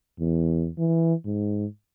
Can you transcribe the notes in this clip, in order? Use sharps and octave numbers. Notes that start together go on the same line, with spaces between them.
E2
E3
G#2